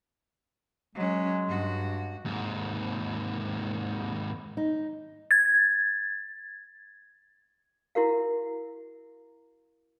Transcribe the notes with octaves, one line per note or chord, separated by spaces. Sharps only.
F#3 G#3 C#4
G2 F#4
D#2 G#2
D#4
G#6 A6
E4 F#4 A#4 F5